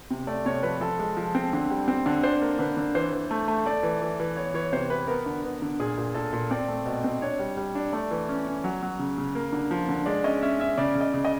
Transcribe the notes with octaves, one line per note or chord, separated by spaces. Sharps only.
C3
A3 D5
C3 C#5
F3 B4
F3 A4
G#3
F3
C4
D3
G3
C4
D3
D4 C5
A#3
D3 B4
D3
E3 C5
E3
A3
A3
A3 D5
E3
E3
E3
B3 C#5
E3 C#5
C3 C5
B3 B4
B3 A#4
D3
B3
D3
A#2 G#4
A#2
A#2 A4
A#2
C4 D5
A3
B2
C4
D4 C#5
G3
G3
D4
A3 D5
E3
C#4
C#4
F#3
F#3
C#3
C#3
A#3
D3
F3
D3
G#3 D5
C#4 D#5
C#4 E5
C#4 E5
C#3 D5
C#3
D#5
C#3
D#5